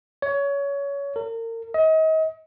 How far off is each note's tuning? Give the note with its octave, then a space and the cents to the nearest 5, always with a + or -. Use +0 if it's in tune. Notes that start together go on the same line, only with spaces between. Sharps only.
C#5 +20
A#4 -35
D#5 +35